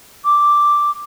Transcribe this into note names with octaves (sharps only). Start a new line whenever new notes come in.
D6